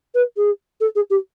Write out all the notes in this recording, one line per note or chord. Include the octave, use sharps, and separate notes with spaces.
B4
G#4
A4
G#4
G4